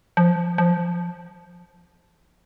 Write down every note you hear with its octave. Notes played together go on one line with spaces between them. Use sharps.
F3
F3